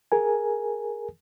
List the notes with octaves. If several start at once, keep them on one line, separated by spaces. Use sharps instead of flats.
G#4 A#4 G#5